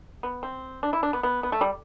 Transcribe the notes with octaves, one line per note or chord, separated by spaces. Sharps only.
B3
C4
D4
E4
D4
B3
B3
B3
A3
G3